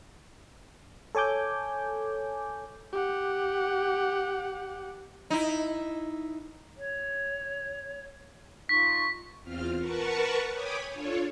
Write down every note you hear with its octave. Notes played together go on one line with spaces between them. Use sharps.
A4 C#5 G#5 D6 G6
G4 F#5
D#4 E4
C#5
D#4 F4 C#6 B6
E2 C4 F4 F6
A#4 B4 F#5 A5 C#6
C#5 G5 G#5 B5 D6 D#6
D4 F4 A4 C#5